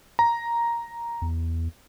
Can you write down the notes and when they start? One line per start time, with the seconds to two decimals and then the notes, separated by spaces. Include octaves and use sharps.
0.19 A#5
1.22 E2